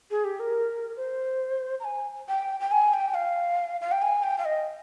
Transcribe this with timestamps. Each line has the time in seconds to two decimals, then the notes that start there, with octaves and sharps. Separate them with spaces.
0.11 G#4
0.24 G4
0.40 A#4
0.97 C5
1.80 A#5
1.84 G#5
2.28 G5
2.60 G5
2.71 G#5
2.93 G5
3.14 F5
3.81 F5
3.92 G5
4.02 G#5
4.23 G5
4.38 F5
4.45 D#5